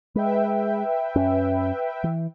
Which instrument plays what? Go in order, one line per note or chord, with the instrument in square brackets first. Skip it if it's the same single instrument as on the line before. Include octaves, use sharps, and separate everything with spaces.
[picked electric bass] G#3 [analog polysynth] B4 E5 G5
[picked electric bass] F#2 C#4
E3